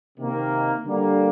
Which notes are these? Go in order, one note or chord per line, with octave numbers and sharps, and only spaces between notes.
C3 D#3 A#3
D3 G3 A#3